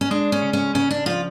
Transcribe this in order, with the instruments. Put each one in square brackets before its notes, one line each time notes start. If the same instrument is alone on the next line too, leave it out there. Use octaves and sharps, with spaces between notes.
[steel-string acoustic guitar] C#4
[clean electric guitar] G#3 [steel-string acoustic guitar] D4
[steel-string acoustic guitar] C#4
[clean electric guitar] C#3
[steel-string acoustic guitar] C#4
[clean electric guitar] C#3 [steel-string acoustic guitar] C#4
[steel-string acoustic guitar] D4
[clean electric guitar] F3 [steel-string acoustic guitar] F4